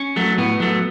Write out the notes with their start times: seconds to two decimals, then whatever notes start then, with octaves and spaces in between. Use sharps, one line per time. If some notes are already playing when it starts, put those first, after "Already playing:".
Already playing: C#4
0.16 F#3 A3
0.38 A2 B3
0.60 F#3 A3